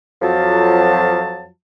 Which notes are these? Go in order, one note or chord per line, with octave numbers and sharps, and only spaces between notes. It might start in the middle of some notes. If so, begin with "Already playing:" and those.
F2 F3 F#3 A5